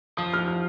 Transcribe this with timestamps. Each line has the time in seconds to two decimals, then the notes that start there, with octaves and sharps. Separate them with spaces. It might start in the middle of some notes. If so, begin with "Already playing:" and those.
0.17 F3 D#6
0.34 F6
0.48 F6